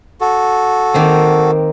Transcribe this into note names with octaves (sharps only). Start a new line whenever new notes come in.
F#4 A4
D#3 A#3 C4